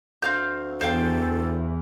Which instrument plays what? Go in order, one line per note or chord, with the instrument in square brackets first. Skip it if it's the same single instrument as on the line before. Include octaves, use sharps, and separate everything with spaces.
[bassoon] D2 [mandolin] C4 F5 G6
[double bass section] E2 E3 [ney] A4 [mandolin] C5 F5 G5